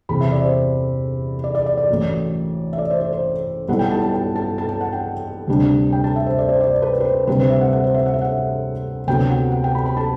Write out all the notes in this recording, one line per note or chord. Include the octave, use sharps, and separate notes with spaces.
E2 C3 E3 B5
E5
D5
C5
D5
D5
D5
D5
A1 A2 F#3
E5
D5
C5
C5
C5
B1 B2 G3 B3 E4 F#5
G5
A5
A5
G5
A5
A5
A5
F#5
G5
D2 C3 G3 D4
G5
A5
E5
C5
D5
C5
D5
B4
B4
C5
D2 C3 G3 C4 B4
C5
E5
F#5
F#5
C5
E5
F#5
E5
F#5
D2 C3 F#3 B3 G5
F#5
F#5
G5
B5
B5
A5